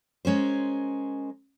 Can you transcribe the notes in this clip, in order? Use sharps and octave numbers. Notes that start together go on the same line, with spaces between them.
G#3 C#4 A#4 C5